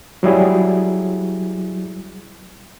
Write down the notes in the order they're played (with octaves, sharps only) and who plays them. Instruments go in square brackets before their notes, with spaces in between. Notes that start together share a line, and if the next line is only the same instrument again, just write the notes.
[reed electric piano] F#3 G3 E4 G#4